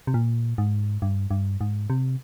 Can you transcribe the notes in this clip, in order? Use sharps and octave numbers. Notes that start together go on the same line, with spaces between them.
C3
A#2
G#2
G2
G2
G#2
C3